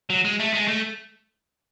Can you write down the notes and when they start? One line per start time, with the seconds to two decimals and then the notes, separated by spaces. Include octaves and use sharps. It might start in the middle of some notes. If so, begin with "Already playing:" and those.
0.10 F#3
0.24 G#3
0.39 A3
0.54 G#3
0.68 A3